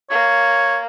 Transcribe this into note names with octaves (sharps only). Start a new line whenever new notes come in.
A#3 C#5